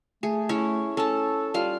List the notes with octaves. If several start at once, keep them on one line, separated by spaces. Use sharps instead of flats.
A3 G#4
C#4 E4 C#5
C#4 A4 A5
G3 F4 F5